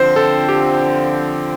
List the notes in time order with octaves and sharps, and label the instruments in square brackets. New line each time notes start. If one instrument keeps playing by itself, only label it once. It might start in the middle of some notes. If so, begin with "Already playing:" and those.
Already playing: [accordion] D3 F3 C4 [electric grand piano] C5
[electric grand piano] A4
G4